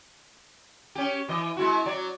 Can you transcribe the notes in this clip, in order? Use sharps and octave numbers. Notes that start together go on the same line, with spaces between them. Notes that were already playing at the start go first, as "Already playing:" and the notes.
C#4 G4
E3 D#5
G#3 E4 F#4
F#3 D5